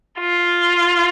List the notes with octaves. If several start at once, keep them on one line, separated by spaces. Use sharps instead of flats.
F4